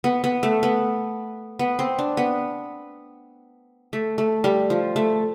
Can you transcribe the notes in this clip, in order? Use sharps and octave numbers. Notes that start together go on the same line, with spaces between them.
B3
B3
A3
B3
B3
C4
D4
B3
A3
A3
G3
F3
A3